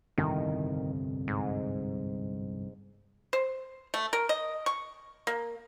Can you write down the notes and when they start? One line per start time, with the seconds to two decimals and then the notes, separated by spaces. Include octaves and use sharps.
0.18 G1 C2 F2 D#3
1.28 G#2
3.33 C5
3.94 A3
4.13 A#4
4.29 D#5
4.66 C#6
5.27 A#3